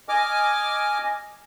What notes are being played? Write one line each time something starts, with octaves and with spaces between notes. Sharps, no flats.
D#5 G#5 D6 F6